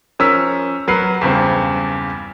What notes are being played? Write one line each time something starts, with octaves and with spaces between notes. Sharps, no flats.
F3 C#4 A#4 E6 B6
F#3 A#4 B4 C7
E2 G2 C#3 C4